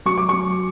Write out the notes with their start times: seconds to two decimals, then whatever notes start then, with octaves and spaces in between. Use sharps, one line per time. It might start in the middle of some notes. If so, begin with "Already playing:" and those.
0.06 F#3 C#6
0.18 D6
0.29 F#3 C#6